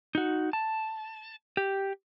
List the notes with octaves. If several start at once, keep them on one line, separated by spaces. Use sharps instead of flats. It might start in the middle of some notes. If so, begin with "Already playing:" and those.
D#4 F#4
A5
G4